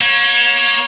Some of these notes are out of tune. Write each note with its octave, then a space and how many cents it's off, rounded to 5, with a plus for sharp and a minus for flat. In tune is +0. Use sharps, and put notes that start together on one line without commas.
A#3 +40 C#5 +0